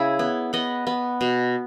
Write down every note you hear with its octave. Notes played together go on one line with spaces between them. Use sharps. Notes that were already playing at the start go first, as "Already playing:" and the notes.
Already playing: C#3 E4 G#4
B3
B3 D#5 F#5
B3
B2